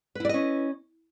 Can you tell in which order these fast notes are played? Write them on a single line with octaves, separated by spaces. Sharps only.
B4 E4 D5 D#5 C#4